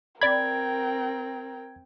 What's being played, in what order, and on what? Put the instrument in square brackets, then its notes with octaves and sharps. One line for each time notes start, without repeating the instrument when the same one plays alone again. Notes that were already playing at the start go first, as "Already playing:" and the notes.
[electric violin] C4 G5 [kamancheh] A#4 [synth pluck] D5 B5 [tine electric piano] G#6